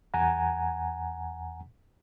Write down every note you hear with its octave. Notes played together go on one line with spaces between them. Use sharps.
E2 F#5 G#5 A#5